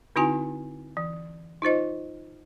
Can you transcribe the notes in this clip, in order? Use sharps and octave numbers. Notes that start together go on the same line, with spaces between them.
D3 C4 D#4 E4 F#4 G#5
E3
D#4 F4 C5 D#5